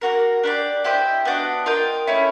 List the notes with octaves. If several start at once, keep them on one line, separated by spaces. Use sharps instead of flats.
A#3 C#4 F#4 A#4
D4 G4 A#4 D5
E4 G4 C5 D#5
B3 D4 F#4
F4 A#4 D#5 G5
A3 C#4 E4